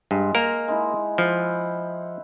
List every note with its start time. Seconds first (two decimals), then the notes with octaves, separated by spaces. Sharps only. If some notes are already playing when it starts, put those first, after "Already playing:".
0.11 G2 G#3
0.35 A#3 A#4
0.68 G#3 D#4 E4
1.18 F3 E4 C5 F#5